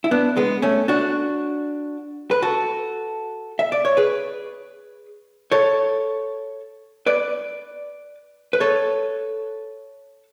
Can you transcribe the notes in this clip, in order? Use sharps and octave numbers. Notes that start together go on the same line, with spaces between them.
E4
B3 D4
G#3 B3
A3 C#4
D4 F#4
B4
F#4 A4
E5
D5
C#5
G#4 B4
A4 C#5
B4 D5
B4
A4 C#5